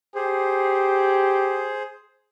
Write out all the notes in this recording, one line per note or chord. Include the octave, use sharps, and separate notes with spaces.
G4 G#4 C5